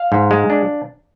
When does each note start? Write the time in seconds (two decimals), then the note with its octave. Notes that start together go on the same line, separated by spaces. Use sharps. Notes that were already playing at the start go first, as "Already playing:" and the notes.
Already playing: F5
0.12 G#2
0.31 G#3
0.50 D4